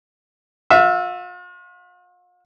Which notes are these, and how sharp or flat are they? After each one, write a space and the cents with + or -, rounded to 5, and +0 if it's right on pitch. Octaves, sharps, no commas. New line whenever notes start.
F4 +45 E5 +0